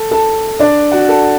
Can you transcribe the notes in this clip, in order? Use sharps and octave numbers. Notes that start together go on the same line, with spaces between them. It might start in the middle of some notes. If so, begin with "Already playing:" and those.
Already playing: A4
A4 A5
D4 D5
F#4 F#5
A4 A5